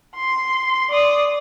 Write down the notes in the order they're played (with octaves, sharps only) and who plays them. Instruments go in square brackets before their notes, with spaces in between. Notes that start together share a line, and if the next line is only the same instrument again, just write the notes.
[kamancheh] C6
D5 D#6